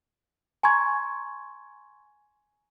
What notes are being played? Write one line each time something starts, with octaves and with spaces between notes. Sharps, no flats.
G#5 A#5 C6 C#6 G#6